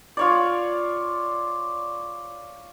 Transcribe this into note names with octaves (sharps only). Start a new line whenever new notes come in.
F4 C#5 D5